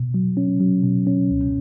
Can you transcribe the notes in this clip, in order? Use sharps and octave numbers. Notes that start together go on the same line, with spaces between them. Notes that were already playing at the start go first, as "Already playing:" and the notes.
Already playing: B2
F#3
C#4
F#3
B2
C#4
C#2